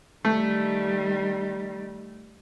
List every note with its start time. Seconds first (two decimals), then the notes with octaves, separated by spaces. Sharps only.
0.25 D#3 G3 A3